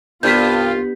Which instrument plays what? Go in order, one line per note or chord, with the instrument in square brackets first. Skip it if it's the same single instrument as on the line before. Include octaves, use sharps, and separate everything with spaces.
[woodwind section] C2 F4 [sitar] G2 [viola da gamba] B3 [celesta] G6 B6